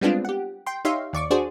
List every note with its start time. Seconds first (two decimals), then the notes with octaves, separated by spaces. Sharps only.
0.01 G3 G#3 B3 C4 D4 F4
0.25 G4 F#5
0.66 G5 C6
0.85 D#4 G4 C#5 E5 F5 C6
1.13 D#2 D5 C#6 D6
1.31 D4 F#4 G#4 C5 D5